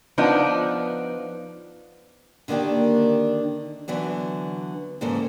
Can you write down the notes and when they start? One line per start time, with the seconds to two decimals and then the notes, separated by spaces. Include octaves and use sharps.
0.18 F3 B3 D4 D#4
2.48 D3 D#3 A#3 D4 G4
3.88 D3 E3 F#3 B3
5.01 D#2 G#2 C#3 E3 A#3 A4